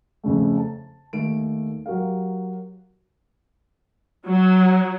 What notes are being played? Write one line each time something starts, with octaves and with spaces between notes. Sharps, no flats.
F2 C#3 A3
A5
D#2 A3 D7
F#3 F#4 G4 A#4 F5
F#3